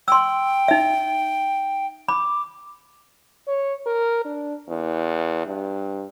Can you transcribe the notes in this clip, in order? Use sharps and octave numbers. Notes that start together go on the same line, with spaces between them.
G5 C6 E6
D#4 E5
B5 D6
C#5
A#4
D4
E2
G2